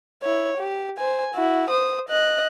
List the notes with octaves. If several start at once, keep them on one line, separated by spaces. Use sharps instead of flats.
E4 C#5
G4
C5 G#5
E4 F#4
C5 D#6
D#5 F#6